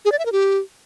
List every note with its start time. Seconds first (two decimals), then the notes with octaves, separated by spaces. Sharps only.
0.05 G#4
0.12 D5
0.19 E5
0.26 A#4
0.32 G4